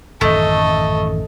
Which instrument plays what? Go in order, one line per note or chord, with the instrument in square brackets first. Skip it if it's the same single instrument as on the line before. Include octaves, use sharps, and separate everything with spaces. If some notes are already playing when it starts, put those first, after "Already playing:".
[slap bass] A1 F#2 D#3 [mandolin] A3 [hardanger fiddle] A4 D#5